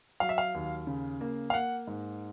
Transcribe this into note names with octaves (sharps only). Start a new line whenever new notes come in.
F#3 F5
E5
F5
D#2
C#3
A#3
F5
A#3 F#5
G#2